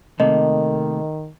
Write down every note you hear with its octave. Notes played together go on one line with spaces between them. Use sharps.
C3 D#3 A3 A#3 D#5